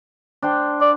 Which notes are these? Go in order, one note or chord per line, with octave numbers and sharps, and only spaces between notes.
D4 C5 G5
D5